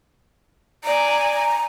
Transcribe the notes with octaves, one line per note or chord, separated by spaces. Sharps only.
D5 G#5 A#5